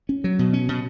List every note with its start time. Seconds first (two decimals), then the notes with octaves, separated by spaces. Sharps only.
0.09 C#4
0.24 F#3
0.39 B2
0.53 C#4
0.69 B2